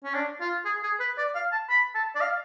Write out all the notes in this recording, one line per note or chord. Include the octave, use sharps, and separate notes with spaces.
C#4
D4
F4
G#4
G#4
B4
D5
F5
A5
B5
A5
D5
F5